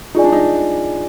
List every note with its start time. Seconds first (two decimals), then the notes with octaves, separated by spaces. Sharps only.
0.15 D#4 F4 G#4 D5 G#5
0.24 D4
0.32 D#4